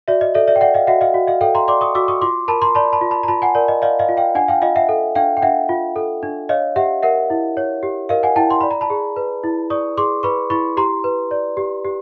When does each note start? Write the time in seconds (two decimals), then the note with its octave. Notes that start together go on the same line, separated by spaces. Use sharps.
0.08 F#4 D5 E5
0.21 D#5
0.34 A4 D5 E5
0.47 D5 E5
0.56 G5
0.61 D5 E5 F#5
0.74 D#5 F5
0.87 F#4 E5 F#5
1.01 D#5 F5
1.14 F#4
1.27 D#5 F5
1.41 A4 F5 G5
1.55 A#5 C6
1.68 D5 C6 D6
1.81 C#6 D#6
1.95 F#4 D6 E6
2.08 C#6 D#6
2.21 F4 C6 D6
2.48 A#4 A5 B5
2.62 A#5 C6
2.75 D5 A5 B5
2.93 A5 B5
3.01 F4
3.11 A5 B5
3.23 A#5
3.28 F4 A5 B5
3.42 F#5 G#5
3.55 A#4 D5
3.68 D#5
3.82 D5 D#5 F5
3.99 D#5 F5
4.09 F4
4.17 F5 G5
4.35 D4 F#5 G#5
4.48 F5 G5
4.62 F4 D#5 F5
4.76 E5 F#5
4.89 A4
5.15 D4 F5 G5
5.37 G5
5.42 D4 E5 F#5
5.69 F4
5.96 A4
6.23 D4
6.49 C#5 D#5 F5
6.76 G4 E5 F#5
7.03 A#4 E5 F#5
7.30 E4
7.57 C#5
7.83 G4
8.09 A#4 D#5 F5
8.23 F#5 G#5
8.36 E4 G5 A5
8.50 C6
8.61 D5 B5
8.71 A#5
8.81 A5 B5
8.90 G#4
9.16 B4
9.44 E4
9.70 D5 C#6 D#6
9.97 G#4 C6 D6
10.23 B4 B5 C#6
10.50 E4 B5 C#6
10.77 G4 A#5 C6
11.04 B4
11.31 D5
11.57 G4
11.84 G4